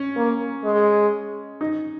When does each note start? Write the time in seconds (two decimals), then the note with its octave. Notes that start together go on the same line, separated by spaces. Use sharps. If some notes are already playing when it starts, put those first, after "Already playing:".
Already playing: C#4
0.16 A#3
0.64 G#3
1.61 D#4